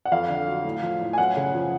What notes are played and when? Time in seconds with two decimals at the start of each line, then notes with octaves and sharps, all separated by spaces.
0.05 F#5
0.12 F2 F5
0.29 D3
0.48 F#3
0.64 A2
0.83 F3
1.01 A2
1.13 G#5
1.18 F#2 F#5
1.37 C#3
1.54 F3